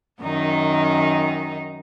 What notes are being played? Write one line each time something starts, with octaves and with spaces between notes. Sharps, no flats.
F#2 D#3 D#4